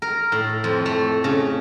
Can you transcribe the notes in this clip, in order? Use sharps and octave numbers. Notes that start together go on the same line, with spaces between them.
A#4
A2
F2
A3
C#3